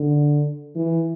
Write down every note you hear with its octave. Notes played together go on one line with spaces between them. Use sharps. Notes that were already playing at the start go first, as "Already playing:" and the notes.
Already playing: D3
E3